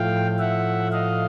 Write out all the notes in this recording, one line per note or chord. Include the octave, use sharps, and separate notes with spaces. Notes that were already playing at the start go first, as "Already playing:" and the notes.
Already playing: A2 F3 A3 F5 G5
E5 F#5
D#5 F5